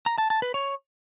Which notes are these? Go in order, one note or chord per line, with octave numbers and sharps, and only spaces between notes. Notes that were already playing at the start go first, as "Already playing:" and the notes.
A#5
A5
A5
B4
C#5